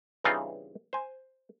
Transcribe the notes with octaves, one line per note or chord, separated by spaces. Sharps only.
G2 C#3 E3 C4 D#4 F4
C5 G#5